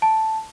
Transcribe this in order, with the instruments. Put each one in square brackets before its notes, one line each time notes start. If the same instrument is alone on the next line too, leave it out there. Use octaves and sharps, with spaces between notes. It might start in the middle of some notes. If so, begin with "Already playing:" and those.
[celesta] A5